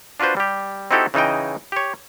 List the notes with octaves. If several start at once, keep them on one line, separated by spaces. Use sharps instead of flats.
D4 F4 F#4 B4 C5
G3 G4
C4 D#4 E4 F#4 G4 A4
C#3 E3 D#4 D#5 G5
G4 C#5